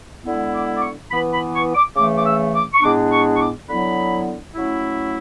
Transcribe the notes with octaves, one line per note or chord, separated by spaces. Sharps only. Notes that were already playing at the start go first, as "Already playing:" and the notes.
D3 G#3 B3 E4
D6
D6
C#6
E3 B3 E4 B5
B5
C#6
D6
C#3 E3 A3 D6
D6
E6
D6
C#6
A2 G#3 B3 D4 D6
C#6
C#6
D6
D3 F#3 B3 E4 B5
F#3 A3 C#4 E4